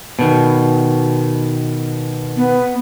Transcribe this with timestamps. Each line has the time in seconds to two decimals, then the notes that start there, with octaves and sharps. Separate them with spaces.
0.19 B2 D#3
2.36 B3